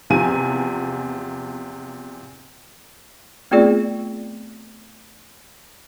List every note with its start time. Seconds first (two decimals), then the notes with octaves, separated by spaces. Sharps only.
0.10 E2 C3 F3 G#5 D#7
3.51 A3 B3 C4 F4 G#4 D5